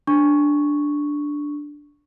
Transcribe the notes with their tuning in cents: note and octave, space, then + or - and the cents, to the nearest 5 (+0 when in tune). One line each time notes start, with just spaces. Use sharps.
D4 +0 C#6 +0